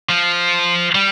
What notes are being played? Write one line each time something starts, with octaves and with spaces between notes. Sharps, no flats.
F3
G3